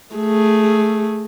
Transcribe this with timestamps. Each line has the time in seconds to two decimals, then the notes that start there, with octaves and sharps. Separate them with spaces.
0.16 A3 G#4